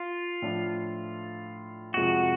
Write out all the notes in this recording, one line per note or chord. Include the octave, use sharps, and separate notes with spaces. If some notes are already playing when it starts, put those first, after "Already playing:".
Already playing: F4
A2 F3 A3 D4
F2 C3 F3 G#3 F#4